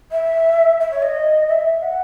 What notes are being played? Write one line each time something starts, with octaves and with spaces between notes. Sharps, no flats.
E5
E5
C#5
D#5
E5
F#5